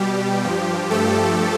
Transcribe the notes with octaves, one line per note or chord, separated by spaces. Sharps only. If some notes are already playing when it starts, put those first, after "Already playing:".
Already playing: B2 G3 G4
G2 F3
A3 A4